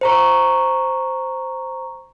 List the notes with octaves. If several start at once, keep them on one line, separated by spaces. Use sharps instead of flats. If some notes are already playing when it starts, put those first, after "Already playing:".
C5 A#5 C#6